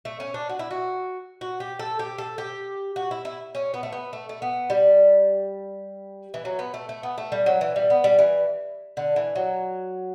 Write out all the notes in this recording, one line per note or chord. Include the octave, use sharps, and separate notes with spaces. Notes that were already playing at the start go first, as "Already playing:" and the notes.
A3
C#4
D4
F#4
E4
F#4
F#4
G4
A4
G4
A4
G4
F#4
E4
E4
C#4
B3
A3
B3
A3
A3
B3
G3
E3
F#3
B3
A3
A3
B3
A3
G3
F#3
E3
G3
B3
G3
E3
D3
E3
F#3